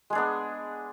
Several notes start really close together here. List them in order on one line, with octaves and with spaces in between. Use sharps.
G#3 G#4 D4 B3